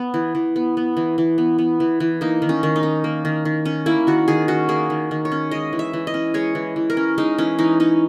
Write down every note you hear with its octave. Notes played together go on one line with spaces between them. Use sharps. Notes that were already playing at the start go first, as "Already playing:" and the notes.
Already playing: B3
E3
E3
B3
B3
E3
E3
B3
B3
E3
E3
A#3 D#4
D#3
C#4
D#3
D#4
C#4
A#3
D#3
D#3
C#4
A#3 E4
D#3 F#4
D#3 G#4
C#4 F#4
A#3 G#4
D#3
D#3
C#5
C#4
G#3 D#5
E3
E5
E3
D#5
C#4
G#3 C#5
E3
E3
A#4
C#4
G#3 D#4
E3 C#4
E3 D#4
C#4 D#4